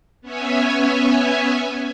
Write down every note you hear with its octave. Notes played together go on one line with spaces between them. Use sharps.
B3 C#4 C#5 E5 G#5